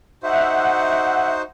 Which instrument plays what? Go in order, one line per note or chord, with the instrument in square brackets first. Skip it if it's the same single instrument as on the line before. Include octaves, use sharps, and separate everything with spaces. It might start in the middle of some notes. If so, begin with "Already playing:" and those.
[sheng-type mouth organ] D#4 F#4 C5 [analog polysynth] E5 F#5